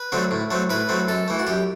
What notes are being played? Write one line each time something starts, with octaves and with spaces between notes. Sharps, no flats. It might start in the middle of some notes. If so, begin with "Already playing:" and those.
Already playing: B4
D3 F#3 A3 C4
A2
F#3 A3 C4
A2 B4
F#3 A3 C4
F#2 A4
E3 A3
F#4
F#2 G4